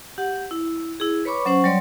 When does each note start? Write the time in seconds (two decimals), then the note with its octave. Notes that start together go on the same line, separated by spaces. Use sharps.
0.18 G4 F#5
0.51 E4
1.00 E4 G#4
1.25 B4 C#5 B5 C#6 D6
1.45 F#3 C#4 C5 F#5 C#6
1.64 F#3 G3 C#5 D5 C6